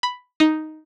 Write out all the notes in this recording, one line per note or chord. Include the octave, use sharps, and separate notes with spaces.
B5
D#4